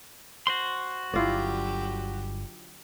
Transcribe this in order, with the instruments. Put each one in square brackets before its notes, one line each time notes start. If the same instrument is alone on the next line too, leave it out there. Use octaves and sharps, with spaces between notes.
[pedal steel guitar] F#4 C5 C6
[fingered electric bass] G1 [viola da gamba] D3 F#3 G4 [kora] E4 F4 D5